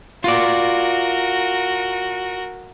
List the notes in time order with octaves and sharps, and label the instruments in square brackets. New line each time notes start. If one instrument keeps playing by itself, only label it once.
[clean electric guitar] F4 D5 [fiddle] F#4 A#4